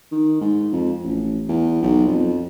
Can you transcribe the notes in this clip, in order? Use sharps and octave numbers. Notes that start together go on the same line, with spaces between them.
D#3
G#2
F2
A1
E2
B1
F2